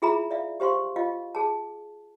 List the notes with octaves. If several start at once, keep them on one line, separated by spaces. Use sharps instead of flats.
E4 F4 G#4 E5 A#5 B5
D5 E5 F5
G4 C5 F5 C6 C#6
F4 D#5 F5
G#4 A5